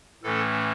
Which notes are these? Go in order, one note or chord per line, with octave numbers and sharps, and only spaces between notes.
A2 E3 A3 C#4 A4